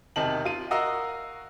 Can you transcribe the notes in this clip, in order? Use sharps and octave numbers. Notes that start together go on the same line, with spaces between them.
E1 C3 D#3 A5 F#7
F4 D#7
F#4 A#4 D#5 F5 A#5 E6